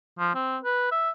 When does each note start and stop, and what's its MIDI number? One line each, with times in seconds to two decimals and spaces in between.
0.19 0.32 53
0.35 0.58 60
0.63 0.90 71
0.91 1.10 76